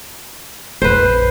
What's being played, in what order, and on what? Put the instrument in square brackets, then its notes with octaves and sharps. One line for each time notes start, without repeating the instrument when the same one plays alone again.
[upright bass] A#1 F2 [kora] B4 C5